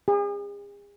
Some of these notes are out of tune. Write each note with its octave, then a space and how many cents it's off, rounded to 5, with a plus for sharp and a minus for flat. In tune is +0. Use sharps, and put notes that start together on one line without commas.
G#4 -40